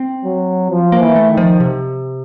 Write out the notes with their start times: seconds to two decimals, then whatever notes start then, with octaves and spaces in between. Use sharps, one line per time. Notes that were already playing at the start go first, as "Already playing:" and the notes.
Already playing: C4
0.24 F#3
0.70 F3
0.92 A#3
1.00 E3
1.15 A3
1.30 D#3
1.37 F3
1.60 C3